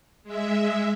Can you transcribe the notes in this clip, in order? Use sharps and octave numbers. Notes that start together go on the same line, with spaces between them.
G#3 E5